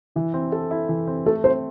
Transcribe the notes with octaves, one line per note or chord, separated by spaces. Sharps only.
E3 E4
C4
A4
E4
E3
C4
A3 A4
C4 C5